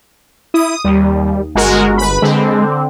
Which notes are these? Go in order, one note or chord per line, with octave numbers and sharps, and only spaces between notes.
E4 D#6
D#2 G3
G1 G#3 F#4 A#4
B4 B5
D3 G#3 C4